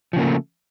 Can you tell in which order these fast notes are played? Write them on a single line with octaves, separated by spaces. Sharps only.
F3 C#3 A#3 A3